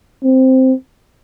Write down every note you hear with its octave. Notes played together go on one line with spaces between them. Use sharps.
C4